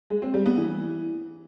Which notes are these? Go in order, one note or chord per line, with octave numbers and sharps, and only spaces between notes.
G#3
C4
G3
B3
E3